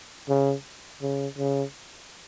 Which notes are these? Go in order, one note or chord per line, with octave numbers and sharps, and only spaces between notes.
C#3
C#3
C#3